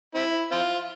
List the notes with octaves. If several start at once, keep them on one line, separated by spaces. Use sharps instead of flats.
C4 E4
C4 F4